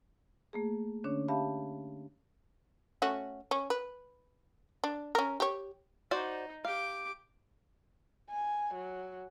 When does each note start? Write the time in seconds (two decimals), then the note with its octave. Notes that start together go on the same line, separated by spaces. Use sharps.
0.53 A3 A#3 G#4
1.04 D3 C#4 D4 C#5
1.28 G4 E5 F5 A5 B5
3.02 A3 C#4 F#4
3.51 C#4
3.70 B4
4.84 D4
5.15 C#4 A#4
5.40 G4 C#5
6.11 D#4 F#4 C5 D5
6.65 G4 F5 D6
8.30 G#5
8.74 F#3